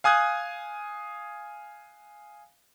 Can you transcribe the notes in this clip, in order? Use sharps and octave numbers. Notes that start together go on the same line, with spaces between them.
F5 G#5 D#6 F#6 G#6